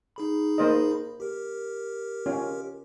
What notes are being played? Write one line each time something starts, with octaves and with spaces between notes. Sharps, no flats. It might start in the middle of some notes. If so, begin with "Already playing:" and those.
D#4 G#4 B5
A#3 C5 D#5
G4 A#4
C#4 F4